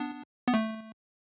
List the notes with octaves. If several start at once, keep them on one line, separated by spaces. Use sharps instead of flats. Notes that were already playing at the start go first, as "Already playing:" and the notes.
Already playing: B3 D4
B3
A3